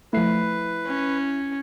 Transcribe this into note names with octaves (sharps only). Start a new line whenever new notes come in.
F3 A3 E4 B4 C7
C#4